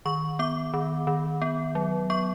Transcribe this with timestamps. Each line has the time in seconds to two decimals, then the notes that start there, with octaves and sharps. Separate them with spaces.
0.05 D#3 C#6
0.39 B3 D6
0.74 D#3
1.07 D#3
1.42 B3
1.75 F#3
2.10 B3 C#6